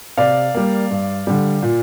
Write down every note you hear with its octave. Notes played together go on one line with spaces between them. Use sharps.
C3 D5 F5
G3 A#3
G2
D3 G3
A#2